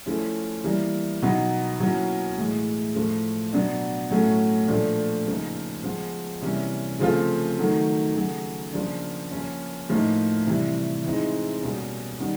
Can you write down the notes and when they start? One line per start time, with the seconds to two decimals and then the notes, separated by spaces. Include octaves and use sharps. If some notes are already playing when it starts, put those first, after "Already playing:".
0.06 F3 A3 C#4 E4
0.64 E3 G3 A#3
1.22 B2 F#3 B3 D#4
1.79 B2 F#3 A#3 C#4 E4
2.37 A2 E3 G#3
2.95 A2 F3 A3
3.53 B2 F#3 B3 D4
4.11 A2 F#3 A3 C#4
4.68 A#2 F3 A3 D4
5.26 C#3 F3 A#3 D#4
5.84 F3 G#3 B3
6.42 C3 E3 G3 A#3 C#4
6.99 C#3 F3 A3 C4 F4
7.58 D#3 F#3 A3
8.15 C#3 F#3 A3
8.73 C#3 F3 A#3 D4
9.31 F3 A#3 C#4
9.89 A2 F3 A#3 D#4
10.47 C3 E3 G3
11.04 E3 G#3 C4 D#4
11.62 B2 G3 A#3 C#4
12.20 D#3 G3 B3